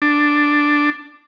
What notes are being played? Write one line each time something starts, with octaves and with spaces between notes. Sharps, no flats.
D4